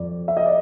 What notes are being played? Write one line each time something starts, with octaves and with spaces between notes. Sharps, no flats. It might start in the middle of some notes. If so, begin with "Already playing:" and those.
Already playing: F2 F3 D5
E5
D#5
D5